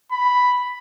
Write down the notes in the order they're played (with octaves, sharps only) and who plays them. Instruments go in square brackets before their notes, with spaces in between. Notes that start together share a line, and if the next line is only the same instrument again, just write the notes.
[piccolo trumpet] B5